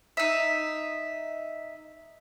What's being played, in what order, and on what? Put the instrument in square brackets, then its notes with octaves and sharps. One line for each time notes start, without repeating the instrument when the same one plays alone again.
[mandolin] D#4 E5